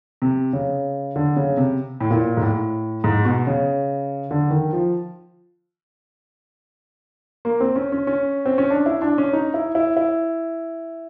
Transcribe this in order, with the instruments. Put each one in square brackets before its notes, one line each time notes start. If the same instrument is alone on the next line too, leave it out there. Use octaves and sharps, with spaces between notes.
[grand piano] C3
C#3
D3
C#3
C3
A2
A#2
G#2
A2
G#2
B2
C#3
D3
D#3
F3
A#3
C4
C#4
C#4
C#4
C4
C#4
D4
E4
D4
C#4
D#4
E4
E4
E4